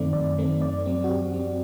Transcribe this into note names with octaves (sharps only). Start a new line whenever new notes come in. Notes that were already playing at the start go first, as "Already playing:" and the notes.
Already playing: F#2 D#3 A3 C4 D5
F#2 D5
D#3 A3 C4
F#2 D5
F#3 C4
F#4
F#2 G4
F#3 C4